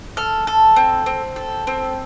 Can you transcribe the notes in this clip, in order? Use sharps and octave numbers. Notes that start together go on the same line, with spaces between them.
A4 F6
A4
C4
C4
A4
C4